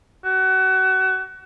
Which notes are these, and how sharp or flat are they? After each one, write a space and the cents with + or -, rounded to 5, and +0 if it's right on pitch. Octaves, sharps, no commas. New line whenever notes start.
F#4 +30